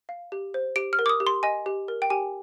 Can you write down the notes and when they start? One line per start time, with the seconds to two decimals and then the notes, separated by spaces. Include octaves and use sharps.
0.09 F5
0.32 G4
0.54 C5
0.76 G4 D7
0.93 F6
0.99 A#4
1.06 D6
1.09 D#6
1.20 G4
1.27 C6
1.43 D#5 G#5
1.66 G4
1.88 A#4
2.02 G5
2.10 G4 G#5